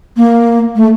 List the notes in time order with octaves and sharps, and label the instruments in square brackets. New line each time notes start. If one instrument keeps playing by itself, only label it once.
[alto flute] A#3
A3